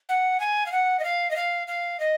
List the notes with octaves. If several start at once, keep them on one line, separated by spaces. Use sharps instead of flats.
F#5
G#5
F5
F#5
D#5
F5
D#5
F5
F5
D#5